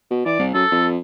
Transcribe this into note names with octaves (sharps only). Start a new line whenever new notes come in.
B2
E3 D5
C2
F#2 A4
F2